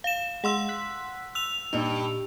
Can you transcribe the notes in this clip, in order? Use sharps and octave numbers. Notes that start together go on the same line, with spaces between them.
F5 E7
G#3 F#5 C6 E6
F#6 B6
E6 F7
G2 A#2 D#4